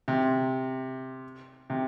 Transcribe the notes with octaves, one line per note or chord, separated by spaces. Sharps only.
C3
C3